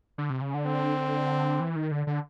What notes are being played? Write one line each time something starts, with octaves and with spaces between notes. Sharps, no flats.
D3
C3
C#3
D3
C4
E3
D#3
D3
D3